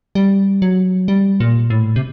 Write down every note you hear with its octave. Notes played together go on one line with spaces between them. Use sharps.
G3
F#3
G3
A#2
A2
C3